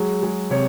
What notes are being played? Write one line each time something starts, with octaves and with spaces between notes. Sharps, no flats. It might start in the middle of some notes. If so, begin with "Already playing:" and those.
Already playing: F#3 G#3
G#3
C3 C#5